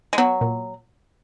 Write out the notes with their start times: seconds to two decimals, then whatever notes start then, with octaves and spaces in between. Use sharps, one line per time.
0.13 G#3
0.18 F#3 B3
0.41 A#2